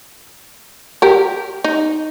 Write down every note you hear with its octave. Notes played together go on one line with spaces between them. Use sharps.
G4 A#4
D#4